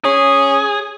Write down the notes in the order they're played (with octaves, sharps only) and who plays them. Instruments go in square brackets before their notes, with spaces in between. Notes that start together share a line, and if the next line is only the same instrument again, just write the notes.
[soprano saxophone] C#4 [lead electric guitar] G#4